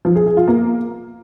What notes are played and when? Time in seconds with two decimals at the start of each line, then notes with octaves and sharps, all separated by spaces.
0.05 F3
0.15 G#4
0.26 G#4
0.37 F4
0.48 A#3